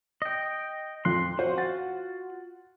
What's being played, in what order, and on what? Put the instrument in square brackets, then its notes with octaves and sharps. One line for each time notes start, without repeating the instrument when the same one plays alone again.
[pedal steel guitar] D#5 G5
[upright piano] F2 F3 F#6 [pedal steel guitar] C6
[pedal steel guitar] F4 F#4 [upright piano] C5
[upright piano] F#5 A6